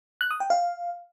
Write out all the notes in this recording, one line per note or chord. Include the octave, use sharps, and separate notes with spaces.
F#6
D#6
G5
F5